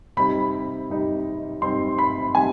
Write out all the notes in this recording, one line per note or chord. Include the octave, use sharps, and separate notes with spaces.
C3 G3 C4 D#4 B5
C3 G3 C4 D#4
C3 G3 C4 D#4 C6
B5
C3 G3 C4 D#4 G#5